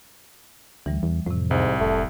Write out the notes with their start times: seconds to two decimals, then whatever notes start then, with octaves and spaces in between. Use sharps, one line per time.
0.86 D2 E3 G3
1.03 E2
1.26 F2 A2 C3
1.51 C2 G#2
1.80 F1 A3